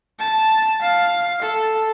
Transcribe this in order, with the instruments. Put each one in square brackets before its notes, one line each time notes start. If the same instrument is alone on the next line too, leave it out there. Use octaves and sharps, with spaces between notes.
[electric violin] A5
F5
A4